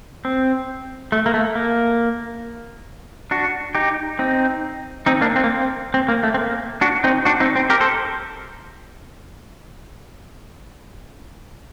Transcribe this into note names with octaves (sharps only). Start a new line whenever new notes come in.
C4
A3
A#3
A3
A#3
D4 F#4
D#4 G4
C4 D#4
C4 D#4
A#3 D4
C4
A#3
C4
C4
A#3
A3
C4
A#3
D4 F#4
C4 D#4
D4 F#4
C4 D#4
C4
G4 A#4
A4 C5